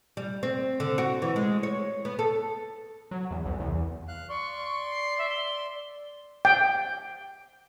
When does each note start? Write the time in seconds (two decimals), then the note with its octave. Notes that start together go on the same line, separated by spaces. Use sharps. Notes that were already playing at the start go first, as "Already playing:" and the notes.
0.17 G3
0.43 C4
0.80 D3
0.98 F#4
1.22 E3
1.36 G#3
1.63 C#5
2.05 B3
2.19 A4
3.11 F#3
3.31 E2
3.46 C2
3.60 E2
4.08 F5 F#6
4.29 D5 C6 C#6
4.91 C7
5.19 E5
5.31 G7
6.45 G5